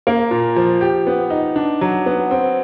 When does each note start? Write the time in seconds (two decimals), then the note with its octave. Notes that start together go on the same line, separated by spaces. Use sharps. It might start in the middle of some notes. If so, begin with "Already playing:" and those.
0.07 A#3
0.31 A#2
0.56 F3
0.81 G4
1.07 B3
1.30 D#4
1.56 D4
1.81 F#3
2.06 B3
2.31 C4